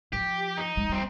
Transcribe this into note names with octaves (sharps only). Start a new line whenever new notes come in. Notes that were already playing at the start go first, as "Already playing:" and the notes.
F3 G4
D#4
G#3
G3 C4